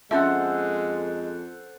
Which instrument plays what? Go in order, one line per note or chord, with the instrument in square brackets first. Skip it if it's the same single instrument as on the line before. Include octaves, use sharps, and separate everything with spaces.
[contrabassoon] F2 [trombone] G#3 [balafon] C#4 E5 [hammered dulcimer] A4 C5 F#5